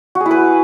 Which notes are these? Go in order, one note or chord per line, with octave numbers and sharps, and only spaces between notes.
F#4
G#4
E4
B4